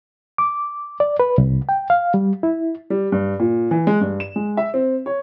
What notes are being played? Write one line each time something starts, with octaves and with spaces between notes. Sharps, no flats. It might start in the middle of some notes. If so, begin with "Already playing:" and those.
D6
D5
B4
C2
G5
F5
G3
E4
G3
G2
A#2
E3
G#3
G2
E7
G#3
E5
C4
C#5